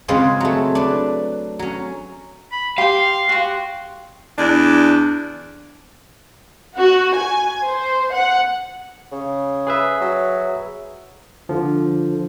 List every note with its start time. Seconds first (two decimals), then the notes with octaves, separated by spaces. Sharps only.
0.08 C#3 G#3 C4 F4 G#4 B4
0.40 F#3 A3
0.75 D4 B4
1.59 F#3 C#4
2.52 B5
2.78 G4 F5 G5 C6
3.29 F#4 G4 C6
4.38 E2 D4
6.75 F#4
7.15 G#5
7.65 C5
8.14 F#5
9.12 C#3
9.67 G#4 B4 E5
10.01 F#3
11.49 D3 F3